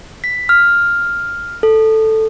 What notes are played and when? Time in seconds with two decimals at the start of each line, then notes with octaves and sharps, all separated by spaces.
0.24 B6
0.49 F6
1.63 A4